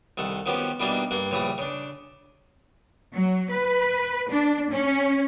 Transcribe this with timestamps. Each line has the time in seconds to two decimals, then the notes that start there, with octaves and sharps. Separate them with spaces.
0.17 C2 D#3 A4 F#5
0.46 D#3 F3 B3 C#4 F#4 G4
0.80 B2 E3 G3 A#3 D4 D#4
1.11 G2 A#3 F#5
1.31 A#1 C#3 E3 G3 D#6
1.58 C#3 D4
3.13 F#3
3.51 B4
4.30 D4
4.70 C#4